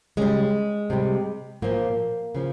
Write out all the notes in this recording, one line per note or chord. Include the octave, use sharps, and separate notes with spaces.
C#3 G3 G#3
C3 G3
A#2 F3 A#3
C#3 F3